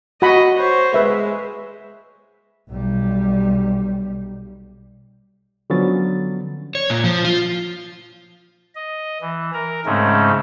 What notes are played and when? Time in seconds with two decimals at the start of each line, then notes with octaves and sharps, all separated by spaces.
0.22 F#4 D#5 F#5 B5
0.58 C5 C#5
0.94 G#3 B4 E5
2.70 B1 G3
5.70 D3 F3 F#3 B3 C#4 A6
6.75 C#5
6.90 A#2
7.04 F3
7.25 F4
8.75 D#5
9.21 E3
9.54 A#4 A#5
9.86 G#2 C#3 G#3 A3 C4 C#4